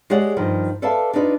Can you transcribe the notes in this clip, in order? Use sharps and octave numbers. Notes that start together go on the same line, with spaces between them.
G#3 G4 G#4 C#5 D5 F#5
G2 D#3 F3
A4 B4 D5 E5 F5 A5
D4 D#4 F4 B4 D5